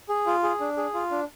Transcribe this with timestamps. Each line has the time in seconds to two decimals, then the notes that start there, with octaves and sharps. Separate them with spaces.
0.09 G#4
0.26 F4
0.43 G#4
0.60 D4
0.77 G#4
0.94 F4
1.11 D4